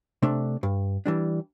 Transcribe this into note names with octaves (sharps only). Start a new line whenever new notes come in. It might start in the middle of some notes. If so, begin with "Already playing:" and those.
C3 A3 D4
G2
E3 G3 D4